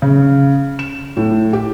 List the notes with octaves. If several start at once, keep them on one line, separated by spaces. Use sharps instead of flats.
C#3
E7
A2
G4